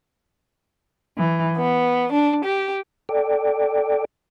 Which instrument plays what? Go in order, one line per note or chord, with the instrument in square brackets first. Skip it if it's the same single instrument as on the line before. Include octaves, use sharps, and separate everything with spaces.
[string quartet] E3
B3
D4
G4
[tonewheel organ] A4 D5 G5